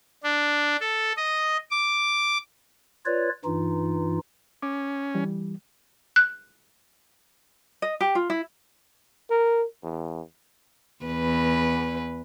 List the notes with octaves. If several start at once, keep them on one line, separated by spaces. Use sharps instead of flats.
D4
A4
D#5
D6
F4 B4 C#5 D5
G2 E3 D#4 F4
C#4 D6
E3 G3
F#6
D#5
G4
F4
E4
A#4
E2
E2 B4